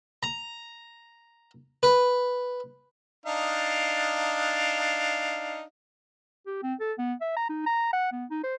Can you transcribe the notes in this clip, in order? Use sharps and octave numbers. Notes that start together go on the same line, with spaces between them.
A#5
B4
D4 D#4 F5
G4
C4
A4
B3
E5
A#5
D#4
A#5
F#5
B3
D#4
C5